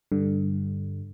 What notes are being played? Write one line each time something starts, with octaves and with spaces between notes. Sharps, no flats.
G2 D3